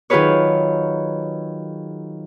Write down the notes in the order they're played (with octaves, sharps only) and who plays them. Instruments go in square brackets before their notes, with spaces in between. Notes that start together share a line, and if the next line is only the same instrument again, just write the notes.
[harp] D#3 F#3 F4 G#4 B4 C#5